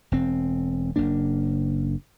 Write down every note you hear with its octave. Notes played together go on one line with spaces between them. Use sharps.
E1 C4
F#1 C#3 A#3 D4